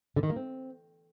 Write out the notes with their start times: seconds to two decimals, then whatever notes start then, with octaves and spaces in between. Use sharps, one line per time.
0.16 D3
0.23 D#3
0.30 A#3
0.36 C4